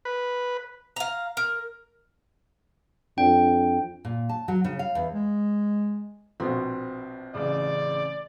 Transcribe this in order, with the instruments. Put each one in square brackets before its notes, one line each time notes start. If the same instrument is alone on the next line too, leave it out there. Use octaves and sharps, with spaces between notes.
[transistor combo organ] B4
[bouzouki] F5 A#5
A#4
[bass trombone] F2 [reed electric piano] D4 [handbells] G5
[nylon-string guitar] A#2
A5
F#3
C#3
F5
E2
[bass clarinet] G#3
[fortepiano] A#1 B2 [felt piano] C4
[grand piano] A1 C#3 [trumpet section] D5